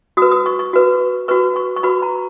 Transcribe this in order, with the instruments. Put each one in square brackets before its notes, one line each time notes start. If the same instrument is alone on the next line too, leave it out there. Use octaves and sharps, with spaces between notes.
[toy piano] F#4 B4 D#6
D#6
C#6
C#6
F#4 B4
F#4 B4 C#6
C#6
C#6
F#4 B4 B5
A#5